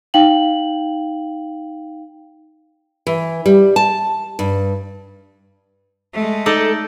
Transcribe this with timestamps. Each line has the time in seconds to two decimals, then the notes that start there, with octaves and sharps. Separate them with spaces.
0.14 D#4 F5 G5 F#7
3.07 E3
3.46 G3
3.76 A5
4.39 G2
6.13 G#3 A3
6.46 D#4 A4 D5 D#5